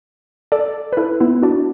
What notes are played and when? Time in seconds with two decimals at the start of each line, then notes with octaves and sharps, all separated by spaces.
0.52 A4 D5
0.93 B4
0.97 E4 A4
1.20 B3 E4
1.42 D4 F#4